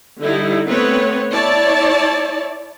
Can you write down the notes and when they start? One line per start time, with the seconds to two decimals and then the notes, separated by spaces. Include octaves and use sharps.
0.20 D3 G3 D#4 E4
0.68 A3 B3 C4 B4 C#5
1.31 E4 C#5 D5 A5